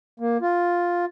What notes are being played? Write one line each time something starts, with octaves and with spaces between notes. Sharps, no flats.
A#3
F4